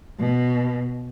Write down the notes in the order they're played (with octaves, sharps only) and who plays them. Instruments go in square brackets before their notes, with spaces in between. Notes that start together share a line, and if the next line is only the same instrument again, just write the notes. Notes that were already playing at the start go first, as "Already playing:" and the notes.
[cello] B2